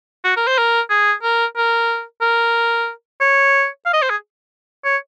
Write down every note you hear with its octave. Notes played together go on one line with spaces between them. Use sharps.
F#4
A#4
C5
A#4
G#4
A#4
A#4
A#4
C#5
F5
D#5
C5
G#4
C#5